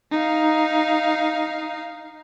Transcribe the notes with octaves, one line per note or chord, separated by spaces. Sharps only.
D#4 F5